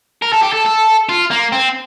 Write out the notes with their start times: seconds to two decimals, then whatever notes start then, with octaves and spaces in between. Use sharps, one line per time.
0.22 A#4
0.33 A4
0.43 G4
0.53 A4
0.66 A4
1.09 F4
1.30 A#3
1.52 C4